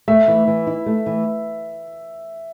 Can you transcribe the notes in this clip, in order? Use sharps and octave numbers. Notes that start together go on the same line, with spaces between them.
A3 E5
E3
E3
E4
A3
E3